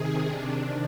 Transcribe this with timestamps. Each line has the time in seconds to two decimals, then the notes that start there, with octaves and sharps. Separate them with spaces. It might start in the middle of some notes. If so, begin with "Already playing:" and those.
Already playing: C3 D#3 G#4
0.24 C3 D#3 D4